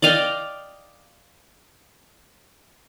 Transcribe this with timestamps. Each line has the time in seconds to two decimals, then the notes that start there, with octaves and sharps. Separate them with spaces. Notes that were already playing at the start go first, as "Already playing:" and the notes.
0.02 D5 D#5 F5 G5